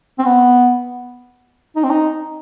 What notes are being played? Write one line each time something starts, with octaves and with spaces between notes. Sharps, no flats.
C4
B3
D#4
C4
D#4